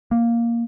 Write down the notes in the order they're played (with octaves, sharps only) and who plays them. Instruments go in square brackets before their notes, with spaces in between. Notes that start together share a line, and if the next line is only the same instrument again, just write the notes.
[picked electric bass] A#3